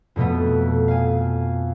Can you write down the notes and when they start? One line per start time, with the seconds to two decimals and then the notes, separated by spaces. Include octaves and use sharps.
0.16 F2 B2 A3 B3
0.88 F5 G#5